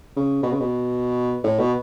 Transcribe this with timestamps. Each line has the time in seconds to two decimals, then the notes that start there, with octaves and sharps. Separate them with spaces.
0.16 C#3
0.43 B2
0.52 C#3
0.60 B2
1.44 A2
1.59 B2